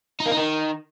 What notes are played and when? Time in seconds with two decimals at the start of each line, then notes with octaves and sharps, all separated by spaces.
0.20 D#4
0.26 A#3
0.31 D#4
0.37 D#3